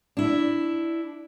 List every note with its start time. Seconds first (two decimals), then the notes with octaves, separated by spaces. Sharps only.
0.17 D4 E4